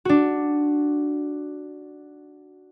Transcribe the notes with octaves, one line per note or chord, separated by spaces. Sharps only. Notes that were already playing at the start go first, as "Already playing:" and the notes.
D4 F#4